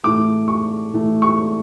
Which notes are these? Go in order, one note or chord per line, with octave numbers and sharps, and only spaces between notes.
A2 E3 A3 D6
C#6
A2 E3 A3
C#6